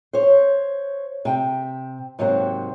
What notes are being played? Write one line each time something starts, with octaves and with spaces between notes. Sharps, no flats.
C5 C#5
C3 G5
G#2 C3 F#3 A#3 C4